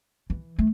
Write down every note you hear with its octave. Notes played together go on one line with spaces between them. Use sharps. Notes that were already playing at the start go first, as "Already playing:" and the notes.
E3
A3